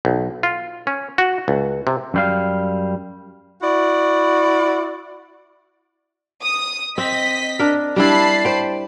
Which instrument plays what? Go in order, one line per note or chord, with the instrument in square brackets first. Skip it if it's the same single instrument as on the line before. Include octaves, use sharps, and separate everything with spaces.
[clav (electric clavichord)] B1
F4
C#4
F#4
C#2
C3
[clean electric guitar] F#2 G3 F5
[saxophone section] E4 F#4 D5
[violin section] D#6
[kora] C4 [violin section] D#5 B6
[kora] D4 A#4
[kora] G3 D4 E4 [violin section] A5 B5 C7
[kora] C5 G5